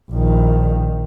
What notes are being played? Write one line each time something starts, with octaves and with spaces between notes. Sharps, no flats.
A#1 D#3